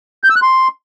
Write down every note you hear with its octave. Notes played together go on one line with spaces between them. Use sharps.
G6
E6
F#6
C6